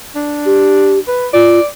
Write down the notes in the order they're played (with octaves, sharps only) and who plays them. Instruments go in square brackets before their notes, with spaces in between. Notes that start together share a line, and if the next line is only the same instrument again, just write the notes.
[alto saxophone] D4
[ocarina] G4
[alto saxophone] B4
[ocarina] F4 [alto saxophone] D5